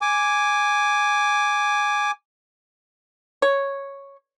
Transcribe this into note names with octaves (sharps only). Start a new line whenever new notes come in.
G#5 D6
C#5